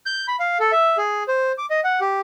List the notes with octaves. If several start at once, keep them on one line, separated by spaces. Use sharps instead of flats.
G6
B5
F5
A4
E5
G#4
C5
D6
D#5
F#5
G4